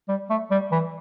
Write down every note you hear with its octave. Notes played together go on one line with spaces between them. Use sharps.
G3
A3
G3
E3